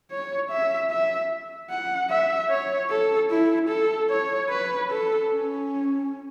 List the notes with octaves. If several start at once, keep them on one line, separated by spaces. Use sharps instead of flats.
C#5
E5
E5
F#5
E5
C#5
A4
E4
A4
C#5
B4
A4
C#4